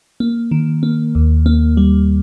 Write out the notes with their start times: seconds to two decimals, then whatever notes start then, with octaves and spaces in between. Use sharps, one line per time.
0.20 A#3
0.51 D#3
0.83 A#3
1.15 D#2
1.46 A#3
1.77 G3